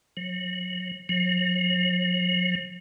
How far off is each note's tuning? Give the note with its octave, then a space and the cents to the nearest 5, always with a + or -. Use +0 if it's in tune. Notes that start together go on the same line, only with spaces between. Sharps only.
F#3 -30
F#3 -45